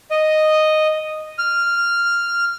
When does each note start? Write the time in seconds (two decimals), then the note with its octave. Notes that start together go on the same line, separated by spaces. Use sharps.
0.11 D#5
1.38 F6